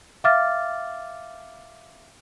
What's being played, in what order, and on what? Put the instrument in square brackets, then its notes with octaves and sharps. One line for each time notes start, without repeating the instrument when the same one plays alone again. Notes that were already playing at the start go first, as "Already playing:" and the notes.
[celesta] E5 F5 D6 F6 A6